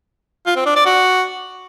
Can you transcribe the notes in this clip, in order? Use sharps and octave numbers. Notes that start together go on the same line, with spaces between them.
F4
C4
D4
D5
F#4